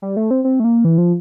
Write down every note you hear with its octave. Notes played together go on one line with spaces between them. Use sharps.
G3
A3
C4
C4
A3
A#3
E3
F3